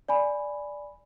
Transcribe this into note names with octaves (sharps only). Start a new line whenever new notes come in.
D5 G#5 B5